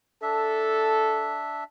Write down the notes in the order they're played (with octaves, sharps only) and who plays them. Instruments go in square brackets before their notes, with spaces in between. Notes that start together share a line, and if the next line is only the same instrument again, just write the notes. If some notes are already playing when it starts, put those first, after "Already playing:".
[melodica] D4 E5 [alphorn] A4